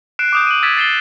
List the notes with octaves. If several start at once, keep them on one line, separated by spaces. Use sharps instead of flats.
F#6 C7 D7 E7
D6 D#6 G6
D#7 F#7
E6 G#6 A6 B6 D7 E7
A6 C7 E7 G7